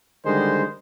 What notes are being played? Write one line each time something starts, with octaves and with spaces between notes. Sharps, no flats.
D3 D#3 G3 G#3 C5